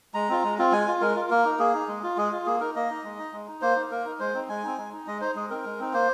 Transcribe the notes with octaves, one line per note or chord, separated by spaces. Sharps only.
G#3 A#5
C4 F4
G#3
C4 F4
G#3 G#5
F4
G#3 A#4
F4
A#3 A#4
D#4
A#3 G#4
D#4
G#3
F4
G#3 G#4
F4
A#3 G#4
D#4 A#4
A#3 D#5
D#4
G#3
D#4
G#3
D#4
A#3 C5
D#4
A#3 A#4
D#4
G#3 C5
C4 D#4
G#3 G#5
C4 D#4
G#3
D#4
G#3 D#5
D#4 C5
G#3 G#4
C4 D#4 A#4
G#3
C4 D#4
A#3 C5